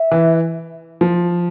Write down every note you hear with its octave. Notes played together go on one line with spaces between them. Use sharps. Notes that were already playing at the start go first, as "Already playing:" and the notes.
Already playing: E5
E3
F3